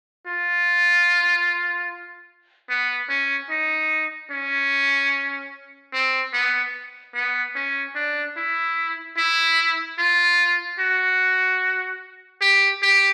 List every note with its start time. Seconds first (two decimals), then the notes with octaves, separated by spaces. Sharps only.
0.27 F4
2.69 B3
3.09 C#4
3.50 D#4
4.32 C#4
5.93 C4
6.33 B3
7.15 B3
7.56 C#4
7.95 D4
8.37 E4
9.17 E4
9.99 F4
10.79 F#4
12.41 G4
12.82 G4